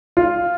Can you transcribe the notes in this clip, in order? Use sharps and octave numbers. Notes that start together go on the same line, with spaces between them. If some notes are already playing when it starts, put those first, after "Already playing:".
F4